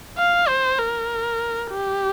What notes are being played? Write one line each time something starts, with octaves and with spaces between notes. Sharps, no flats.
F5
C5
A#4
G4